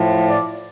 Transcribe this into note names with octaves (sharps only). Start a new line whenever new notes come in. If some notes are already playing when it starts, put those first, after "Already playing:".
Already playing: A2 F3
D5